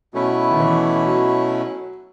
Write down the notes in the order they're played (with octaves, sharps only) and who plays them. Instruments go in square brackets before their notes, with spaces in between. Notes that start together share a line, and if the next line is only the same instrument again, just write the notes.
[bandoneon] B2 A3 C#4 E4 B4 [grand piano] F#3
[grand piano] D#3
E3
F#3